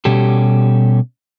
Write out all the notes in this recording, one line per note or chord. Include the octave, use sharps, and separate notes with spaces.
B2 G3 C#4 G4 A4